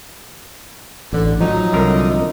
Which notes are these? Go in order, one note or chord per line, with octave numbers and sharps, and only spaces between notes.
A1 D3
F3 F#3 D#4
C2 D3 A#4